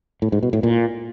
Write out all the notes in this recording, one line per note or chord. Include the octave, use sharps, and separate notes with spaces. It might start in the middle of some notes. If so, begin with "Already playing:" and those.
A2
G#2
B2
A2
A#2